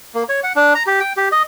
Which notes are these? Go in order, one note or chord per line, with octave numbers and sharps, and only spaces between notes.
A#3
C#5
F#5
D4
A#5
G4
G5
G4
D#5